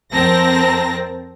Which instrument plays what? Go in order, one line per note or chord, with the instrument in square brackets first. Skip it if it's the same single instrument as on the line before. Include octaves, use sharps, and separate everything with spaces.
[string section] F2 F3 C4 A#4 A5 A#6